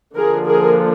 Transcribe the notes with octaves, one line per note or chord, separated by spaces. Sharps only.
D3 F3 A#3 D4 G#4 A#4
G#4 A#4